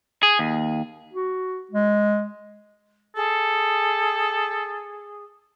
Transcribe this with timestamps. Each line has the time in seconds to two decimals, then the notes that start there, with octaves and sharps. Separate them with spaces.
0.23 G#4
0.39 D#2
1.13 F#4
1.71 G#3
3.16 G#4 A4